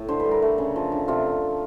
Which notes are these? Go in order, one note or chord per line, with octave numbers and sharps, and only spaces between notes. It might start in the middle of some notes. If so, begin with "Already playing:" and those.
Already playing: A2
D3 C5
B4
G3
A#4
A3
C#3
F3
D3
C3 F4